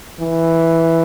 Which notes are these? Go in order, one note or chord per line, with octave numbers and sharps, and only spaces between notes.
E3